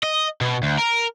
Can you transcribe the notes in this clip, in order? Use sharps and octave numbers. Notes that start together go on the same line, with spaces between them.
D#5
B2
D2
A#4